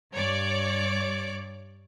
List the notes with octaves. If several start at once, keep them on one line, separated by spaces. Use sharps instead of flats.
G2 C#5 D5 D6